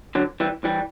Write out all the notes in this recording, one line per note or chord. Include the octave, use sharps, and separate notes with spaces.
D3 F#3
E3 G3
E3 G3